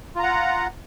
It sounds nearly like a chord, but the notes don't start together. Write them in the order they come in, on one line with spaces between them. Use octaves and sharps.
F4 A#5 F#5